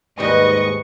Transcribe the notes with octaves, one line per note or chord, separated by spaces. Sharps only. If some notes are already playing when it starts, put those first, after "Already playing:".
D#2 G#2 G3 B4 D#5 C#6